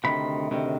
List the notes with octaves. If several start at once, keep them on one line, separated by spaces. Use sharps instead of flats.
D2 C3 D#3 B5
D2 C3 D#3